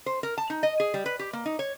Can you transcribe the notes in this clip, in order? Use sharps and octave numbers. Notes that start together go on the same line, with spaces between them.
C5
A#4
A5
D#4
D#5
G#4
G3
B4
G4
A#3
D#4
C#5